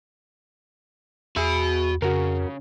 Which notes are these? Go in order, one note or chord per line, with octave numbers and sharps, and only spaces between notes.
E2 F#4 G#4 E5 B5
F2 C#3 F#4 A#4